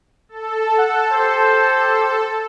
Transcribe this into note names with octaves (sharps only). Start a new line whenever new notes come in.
A4
F#5
G4 C5